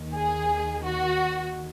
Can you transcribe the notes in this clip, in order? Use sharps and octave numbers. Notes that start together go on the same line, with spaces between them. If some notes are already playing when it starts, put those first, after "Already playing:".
Already playing: D#2 D#3
G#4
F#4